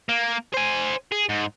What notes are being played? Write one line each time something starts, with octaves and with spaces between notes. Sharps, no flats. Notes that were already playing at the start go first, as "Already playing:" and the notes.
A#3
C5 G#5
G#4
G#2